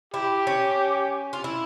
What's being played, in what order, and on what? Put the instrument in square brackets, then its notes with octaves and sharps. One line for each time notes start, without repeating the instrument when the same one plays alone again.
[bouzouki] E4 [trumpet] G4
[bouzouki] C#4
F4
E4